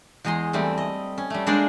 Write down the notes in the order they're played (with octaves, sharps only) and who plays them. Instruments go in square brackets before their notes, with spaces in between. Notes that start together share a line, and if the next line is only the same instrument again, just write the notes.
[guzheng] E2 G#3 D#5 A#5 C6
E3 G3 A3 C4
D#5
C#4
G3 A3
G#3 A#3 D4 A#4 C5 D5